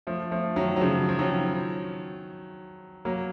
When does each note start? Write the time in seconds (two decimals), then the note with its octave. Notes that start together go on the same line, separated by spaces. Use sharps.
0.07 F3 A3
0.31 F3 A3
0.56 D#3 F#3
0.76 F#3
0.81 C#3 F3
1.09 F3
1.18 D#3 F#3
3.05 F#3 A#3